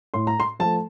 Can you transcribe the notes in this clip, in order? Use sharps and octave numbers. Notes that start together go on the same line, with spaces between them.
A2 C6
A#5
C6
F3 A3 A5